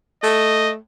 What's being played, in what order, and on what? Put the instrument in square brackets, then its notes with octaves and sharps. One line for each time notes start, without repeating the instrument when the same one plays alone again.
[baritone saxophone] A3 [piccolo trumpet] D#5